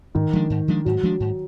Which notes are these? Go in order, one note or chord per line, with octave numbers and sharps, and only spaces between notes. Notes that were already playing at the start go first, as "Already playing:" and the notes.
G#2 D#3
F3 G#3 D4
G#2
F3 G#3 D4
G#2 F#3
F3 G#3 D4
G#2